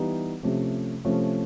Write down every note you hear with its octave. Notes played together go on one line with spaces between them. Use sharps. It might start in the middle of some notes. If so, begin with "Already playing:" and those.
Already playing: E3 G3 B3 D#4
C3 F3 A3 C#4
C3 F3 A3 C#4